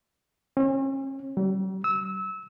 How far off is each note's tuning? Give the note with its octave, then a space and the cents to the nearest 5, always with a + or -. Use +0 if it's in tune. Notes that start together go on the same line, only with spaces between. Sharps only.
C#4 -40
G3 -45
E6 -25